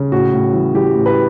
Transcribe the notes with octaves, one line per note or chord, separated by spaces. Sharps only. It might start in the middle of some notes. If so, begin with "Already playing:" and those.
Already playing: C#3
A2 F#4
A2
E3
E3 G4
A2
B4